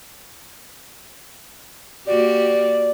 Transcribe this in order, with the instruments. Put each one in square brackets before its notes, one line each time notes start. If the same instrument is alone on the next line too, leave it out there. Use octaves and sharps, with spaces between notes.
[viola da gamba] A#3 F#4 G4 [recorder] D5